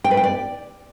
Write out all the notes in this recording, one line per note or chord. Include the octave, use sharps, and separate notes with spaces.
G5
B4
G5
D5